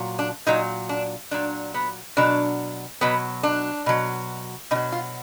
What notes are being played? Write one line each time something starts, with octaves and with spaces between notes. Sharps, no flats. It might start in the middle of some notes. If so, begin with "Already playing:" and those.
Already playing: A#2 F#3
D4
A#2 F#3 D#4
D4
A#2 F#3 D4
B3
B2 F#3 D4
B2 F#3 B3
D4
B2 F#3
B2 F#3 D#4
F4